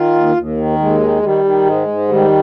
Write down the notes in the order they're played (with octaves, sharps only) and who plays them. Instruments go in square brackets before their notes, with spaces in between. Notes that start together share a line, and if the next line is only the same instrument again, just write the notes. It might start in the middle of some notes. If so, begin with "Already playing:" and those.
Already playing: [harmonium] D#3 F4
D#2
D#2
D#3
D#2 G#3
D#3
D#3 G3
D#3
G#2 G#3
G#2
D#3 G3